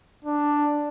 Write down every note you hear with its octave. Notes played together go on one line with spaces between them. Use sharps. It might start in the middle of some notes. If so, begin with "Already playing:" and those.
D4